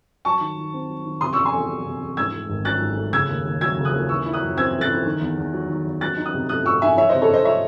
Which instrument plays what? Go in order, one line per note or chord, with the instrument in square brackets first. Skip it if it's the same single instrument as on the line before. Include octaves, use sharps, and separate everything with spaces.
[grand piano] F#3 [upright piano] A5 C#6
[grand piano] D#3
D#3
C4
F#3
D#3
[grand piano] C3 [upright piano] C6 D#6
[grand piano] E2 [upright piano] C#6 E6
[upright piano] G#5 C6
[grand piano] E2
F#3
C3
E2
[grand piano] G#2 [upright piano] E6 G#6
[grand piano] A3
G#1
[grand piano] F#3 [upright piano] F#6 A6
[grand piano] G#2
A3
[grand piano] C#3 [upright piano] E6 G#6
[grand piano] D#2
D#2
[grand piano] F#3 [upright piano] E6 G#6
[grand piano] C#3
[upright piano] D#6 F#6
[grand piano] D#2
[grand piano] E3 [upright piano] C#6 E6
[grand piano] E4
[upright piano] D#6 F#6
[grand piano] F#2
[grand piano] C4 [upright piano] E6 G#6
[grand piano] E3
[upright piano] F#6 A6
[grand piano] E4
D#3
E2
E2
F#3
D#3
E2
[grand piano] F#3 [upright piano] F#6 A6
[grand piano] D#4
[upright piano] D#6 F#6
[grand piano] C3
[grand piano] A3 [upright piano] D#6 F#6
[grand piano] F#3 [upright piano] C#6 E6
[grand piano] D#4 [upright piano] E5 G#5
[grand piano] E3 [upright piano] C#5 E5
[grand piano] C3 [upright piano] C5 D#5
[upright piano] A4 C#5
[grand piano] C3 [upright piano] C5 D#5
[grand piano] A3 [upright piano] C#5 E5